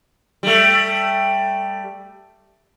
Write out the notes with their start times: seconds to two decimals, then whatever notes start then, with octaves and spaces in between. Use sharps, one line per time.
0.43 G3 A3